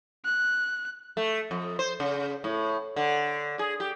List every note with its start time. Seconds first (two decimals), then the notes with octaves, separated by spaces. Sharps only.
0.25 F#6
1.17 A3
1.51 F2
1.79 C5
2.00 C#3
2.44 A2
2.96 D3
3.59 G#4
3.80 G4